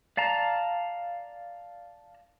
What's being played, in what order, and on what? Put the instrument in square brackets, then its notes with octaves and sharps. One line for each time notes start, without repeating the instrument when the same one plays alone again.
[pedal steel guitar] D5 F5 A5 A#5